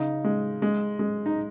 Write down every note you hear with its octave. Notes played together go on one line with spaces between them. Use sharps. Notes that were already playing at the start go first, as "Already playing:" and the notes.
Already playing: C#3 D#4
G#3
G#3
G#3
D#4